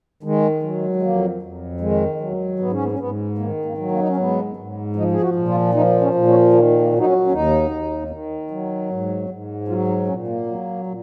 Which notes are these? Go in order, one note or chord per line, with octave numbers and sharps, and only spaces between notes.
D#3 G#3
F#3
G#3
F2 A#3
F2
D#3 G#3
F#3
G#2 B3
C#4
B3
C#4
G#2 B3
D#3 A#3
A#3
F#3
A#3
D#4
C#4
G#2 B3
G#2
F3 D#4
G#4
F#4
A#2
F4
F3 D#4
C#4
A#2
C#4
D#3 A#3
A#3
F#3
D#4
C#4
C#4
D#2 D#4
D#2
D#3
F#3
G#2
G#2
F#3 F4
D#4
A#2 C#4
A#3
F#3
A#2